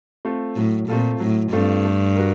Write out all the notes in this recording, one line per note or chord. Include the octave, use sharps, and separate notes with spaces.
A3 C4 F4 A4
A2 F#3
A#2 A3 C4 F4 A4
A2 F#3
G2 A3 C4 F4 A4
A3
F#4 A#4